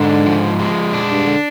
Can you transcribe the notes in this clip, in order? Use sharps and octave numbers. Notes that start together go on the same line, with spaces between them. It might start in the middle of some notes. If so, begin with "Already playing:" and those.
Already playing: G#2 D3 D4
F3
G#3
D4
G2
D3